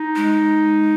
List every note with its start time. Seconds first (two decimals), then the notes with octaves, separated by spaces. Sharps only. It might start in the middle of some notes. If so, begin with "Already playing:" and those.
Already playing: D#4
0.16 G#3